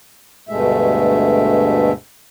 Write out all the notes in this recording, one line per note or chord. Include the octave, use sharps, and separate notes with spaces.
D2 G2 B2 G#3 A3 E5